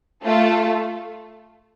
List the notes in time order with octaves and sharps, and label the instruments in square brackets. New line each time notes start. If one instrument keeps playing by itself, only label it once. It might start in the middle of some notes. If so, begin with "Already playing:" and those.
[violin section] A3 F4 A4